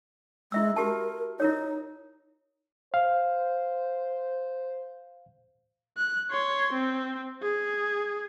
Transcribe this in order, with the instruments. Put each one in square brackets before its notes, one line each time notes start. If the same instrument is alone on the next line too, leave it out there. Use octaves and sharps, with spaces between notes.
[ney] G#3 [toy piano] E4 E5 E6
[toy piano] F#4 G4 A5 [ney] A#4
[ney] D#4 [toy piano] E4 A#4 C#5
[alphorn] C5 [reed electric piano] F5
[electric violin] F#6
C#5 C6
C4
G#4